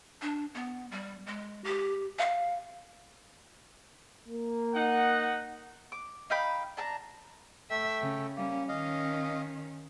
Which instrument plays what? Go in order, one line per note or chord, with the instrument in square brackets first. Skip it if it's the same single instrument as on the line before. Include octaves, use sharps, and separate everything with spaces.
[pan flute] D4
B3
G3
G#3
G4
F5
[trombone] A#3
[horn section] D#4 F#5
[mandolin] D6
D#4 F5 G5 B5
D4 A5 A#5
[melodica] A3 A4 G5 [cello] E5
[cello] C#3
[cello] G3 C#4 [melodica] A#3
[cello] D#3 C#4 [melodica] D#5 F5